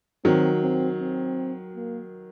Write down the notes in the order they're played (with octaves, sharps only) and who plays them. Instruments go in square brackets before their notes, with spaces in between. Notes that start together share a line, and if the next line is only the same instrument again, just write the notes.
[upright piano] D#3 F#3 [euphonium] C4
[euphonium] C4
C4
A#3